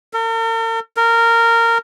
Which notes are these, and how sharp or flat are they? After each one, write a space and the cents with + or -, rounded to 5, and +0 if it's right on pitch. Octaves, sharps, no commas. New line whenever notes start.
A#4 -45
A#4 -15